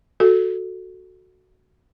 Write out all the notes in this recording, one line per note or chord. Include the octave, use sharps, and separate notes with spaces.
F#4 A4